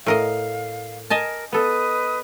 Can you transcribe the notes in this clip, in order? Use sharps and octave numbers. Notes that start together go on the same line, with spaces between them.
A2 A#4 D#5 F5
A#4 D#5 G#5 A5
B3 A4 B4 D#5 D#6